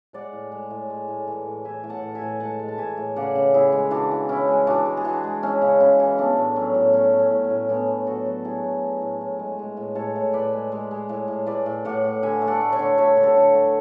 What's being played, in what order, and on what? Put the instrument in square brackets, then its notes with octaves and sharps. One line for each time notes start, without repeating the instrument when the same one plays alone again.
[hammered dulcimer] G#3 D5 F#5
A2
G#3
A2
G#3
A2
E3
A2
E3 E5 G#5
A2
F#5 A5
A2
E5 G#5
A2
G#3 F#5 A5
G#3
A5
E3 E5 G#5
A2
C#3 D5 F#5
C#3
C#3 E4 G#4
G#3
E3 D4 F#4
E3
E3 C#4 E4
G#3
E3 D4 F#4
G#3
G#4
E3 D4 F#4
G#3
G#3 C#4 E4
C#3
C#3 C#4 E4
E3
A3 B3 D4
A2
F#3 C#4
A2
A3 C#4
A3
C#4
A2
C#4
A2
A2 B3 D4
A2
F#3 F#4 A4
F#3
F#3 E4 G#4
A3
A3
A2
A2
G#3
G#3
A2
A2 A4 C#5
A2
A2 B4 D5
G#3
G#3
G#3
A2
A2
A2 B4 D5
A2
A2 D5 F#5
A2
D3 E5 G#5
A3
D5 F#5
A3
C#5 E5
D3
A3 C#5 E5
D3
A4 C#5
D3
A3